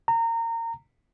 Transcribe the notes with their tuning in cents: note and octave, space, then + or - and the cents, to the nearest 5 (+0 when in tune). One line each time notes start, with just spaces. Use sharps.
A#5 -25